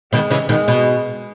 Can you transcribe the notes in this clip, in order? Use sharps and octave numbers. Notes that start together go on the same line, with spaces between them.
B2 D#3 G#3
C#3 E3
B2 D#3 G#3
B2